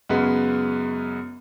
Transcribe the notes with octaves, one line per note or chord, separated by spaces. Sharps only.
F#2 C#3 G#3 B3 F#4